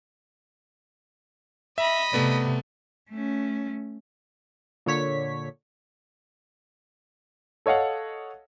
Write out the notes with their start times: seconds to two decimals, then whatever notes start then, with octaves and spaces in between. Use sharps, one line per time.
1.78 D#5 E5 B5
2.13 C3 A3 B3 D5
3.10 A3 C#4
4.86 A#2 D3 C#5 B6
7.66 A4 C#5 D#5 F5 F#5